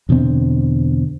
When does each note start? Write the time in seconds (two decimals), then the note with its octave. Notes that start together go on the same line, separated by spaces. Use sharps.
0.09 E2 B2 D3 C4